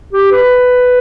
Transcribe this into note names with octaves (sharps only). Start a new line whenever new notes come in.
G4
B4